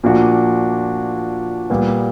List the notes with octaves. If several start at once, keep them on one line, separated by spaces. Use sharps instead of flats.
A#2 F3 A#3 D4 F#4
A#2 G3 B3